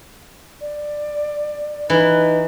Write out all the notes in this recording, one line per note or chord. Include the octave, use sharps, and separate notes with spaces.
D5
E3 D#4 B4